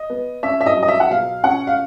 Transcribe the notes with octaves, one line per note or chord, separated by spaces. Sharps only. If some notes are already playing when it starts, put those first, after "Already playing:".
Already playing: D#5
B3
C#4 E5
E5
D#5
F#3
D#5
E5
F#5
B2 F5
C#4 F#5
F5